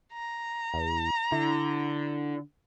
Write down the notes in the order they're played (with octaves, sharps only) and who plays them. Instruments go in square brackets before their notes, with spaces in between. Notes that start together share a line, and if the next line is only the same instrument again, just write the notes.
[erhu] A#5
[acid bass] E2
[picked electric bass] D3 [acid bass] E4